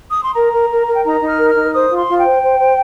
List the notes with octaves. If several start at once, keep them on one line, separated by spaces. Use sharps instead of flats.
D#6
C6
A#4 A#5
A#4
A#4
A#4
G5
D#4 A#5
D#4
F6
A#4
F6
D#4
C5 D#6
F4
C6
F4
G5
C5
C5
C5